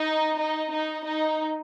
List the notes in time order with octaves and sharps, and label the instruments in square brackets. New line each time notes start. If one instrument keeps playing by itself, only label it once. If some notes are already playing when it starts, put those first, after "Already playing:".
Already playing: [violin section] D#4
D#4
D#4
D#4